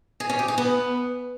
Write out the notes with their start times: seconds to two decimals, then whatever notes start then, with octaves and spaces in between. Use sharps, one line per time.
0.20 G#4
0.30 C#4
0.39 G4
0.48 G#4
0.58 B3